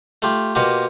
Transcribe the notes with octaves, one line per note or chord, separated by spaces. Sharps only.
A3 F4 G4
B2 A#3 F4 G4